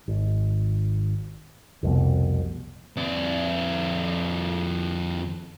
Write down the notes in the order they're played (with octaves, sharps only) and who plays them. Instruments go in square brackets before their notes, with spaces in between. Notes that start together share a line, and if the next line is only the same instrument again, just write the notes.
[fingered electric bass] G#1
F1 C2 F2 B2
[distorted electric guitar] F2 D5